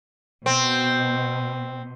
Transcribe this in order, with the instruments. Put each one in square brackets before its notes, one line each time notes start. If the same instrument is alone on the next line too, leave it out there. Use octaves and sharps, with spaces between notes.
[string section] B2 [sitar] C4